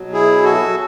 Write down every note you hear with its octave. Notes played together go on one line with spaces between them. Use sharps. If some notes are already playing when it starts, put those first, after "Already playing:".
Already playing: B2 F#3
E4 G#4
F#4 A4